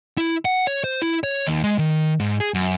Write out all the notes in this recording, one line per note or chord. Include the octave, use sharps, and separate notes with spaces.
E4
F#5
C#5
C5
E4
C#5
D#2
G#3
D#3
G#2
G#4
F#2